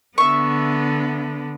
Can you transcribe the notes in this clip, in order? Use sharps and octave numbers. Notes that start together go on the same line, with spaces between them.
D3 B3 E5 C#6